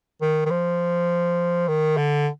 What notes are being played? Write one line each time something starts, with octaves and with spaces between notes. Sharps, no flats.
D#3
D#3
F3
D#3
D3